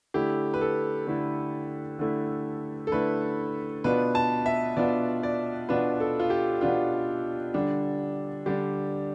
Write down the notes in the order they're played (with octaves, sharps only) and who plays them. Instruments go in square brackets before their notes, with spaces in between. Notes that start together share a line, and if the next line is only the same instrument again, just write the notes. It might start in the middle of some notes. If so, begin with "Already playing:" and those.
[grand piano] D3 A3 E4 G4
B4
A4
D3 A3 E4
D3 A3 E4
A4
D3 A3 E4 B4
B2 B3 D4 F4 B4
A5
E5
B2 B3 D4 F4 D5
D5
B2 B3 D4 F4 B4
A4
F4
G4
B2 B3 D4 F4
D3 G3 D4
D3 G3 D4 G4